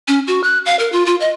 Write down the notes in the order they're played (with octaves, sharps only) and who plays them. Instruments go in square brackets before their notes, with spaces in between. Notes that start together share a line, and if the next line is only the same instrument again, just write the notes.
[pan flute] C#4
F#4
F#6
F5
A#4
F4
F4
D#5